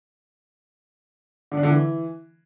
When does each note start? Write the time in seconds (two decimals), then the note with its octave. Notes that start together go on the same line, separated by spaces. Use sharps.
1.52 D3
1.57 D4
1.63 D3
1.69 E3